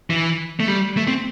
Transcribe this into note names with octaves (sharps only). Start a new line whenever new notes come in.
E3
A3
G3
A3
C4